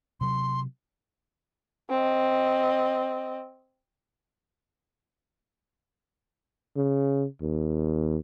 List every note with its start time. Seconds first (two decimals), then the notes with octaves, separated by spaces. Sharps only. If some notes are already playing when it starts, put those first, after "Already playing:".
0.21 C3 F#3 C6
1.90 C4 D#5
6.76 C#3
7.41 D#2